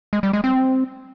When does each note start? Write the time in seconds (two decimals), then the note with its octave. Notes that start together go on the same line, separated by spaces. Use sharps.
0.13 G#3
0.23 G3
0.33 G#3
0.44 C4